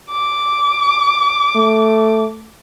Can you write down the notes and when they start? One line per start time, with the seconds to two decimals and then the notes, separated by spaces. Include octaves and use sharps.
0.11 D6
1.56 A3